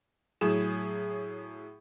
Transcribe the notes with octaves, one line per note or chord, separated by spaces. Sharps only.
A2 F#3 G#4 E7